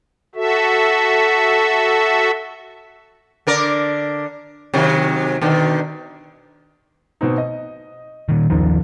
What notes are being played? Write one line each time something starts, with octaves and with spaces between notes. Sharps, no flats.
F#4 A4 E5
D3 A#4 D5
C3 D#3 F#3
B2 D3 D#3
B2 C4 D#4
D#5
A#2 D#3
F#1 D#2 G#2 F3